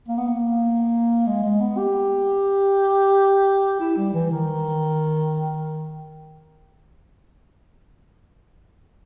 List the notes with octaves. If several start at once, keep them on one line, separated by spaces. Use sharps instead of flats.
A#3
B3
A#3
G#3
G#3
B3
G4
E4
G3
E3
D#3